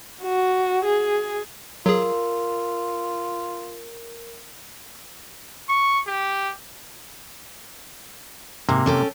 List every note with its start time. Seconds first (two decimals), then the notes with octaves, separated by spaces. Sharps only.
0.23 F#4
0.85 G#4
1.86 F#3 F4 G#4 A#4
5.69 C#6
6.07 G4
8.69 G#2 C3 A#3
8.86 C#4 A4 G5